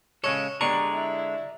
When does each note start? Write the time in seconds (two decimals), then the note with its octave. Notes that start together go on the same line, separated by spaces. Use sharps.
0.24 C#3 G#3 A4 C#5
0.61 D3 G#3 D4 G4 D5 A#5 C#6
0.94 E4